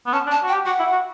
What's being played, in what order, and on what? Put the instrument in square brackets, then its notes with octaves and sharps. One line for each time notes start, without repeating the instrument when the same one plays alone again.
[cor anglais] B3
[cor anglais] C#4 [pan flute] A5
[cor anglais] D4
[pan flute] A5
[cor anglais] F#4
[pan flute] G5
[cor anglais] G4
[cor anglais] F#4 [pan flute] F#5
[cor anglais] E4
F#4